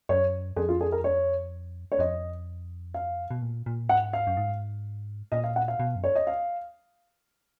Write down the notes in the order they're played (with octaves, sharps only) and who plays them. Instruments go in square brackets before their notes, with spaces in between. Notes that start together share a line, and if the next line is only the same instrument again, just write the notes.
[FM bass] F#2 [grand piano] C#5
[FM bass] F2 [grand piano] G#4
[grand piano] F4
G#4
A#4
C#5
C#5
[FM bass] F2 [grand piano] D#5
[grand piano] F5
[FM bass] B2
A#2
A#2
[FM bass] G#2 [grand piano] F#5
[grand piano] F5
[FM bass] F#2
G#2
[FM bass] A#2 [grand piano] D#5
[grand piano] F5
F#5
F5
[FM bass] B2
F#2
[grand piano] C#5
D#5
F5